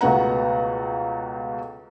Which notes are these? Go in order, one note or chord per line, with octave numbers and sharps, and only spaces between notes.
C#2 B2 A3 B3 F#5 A#5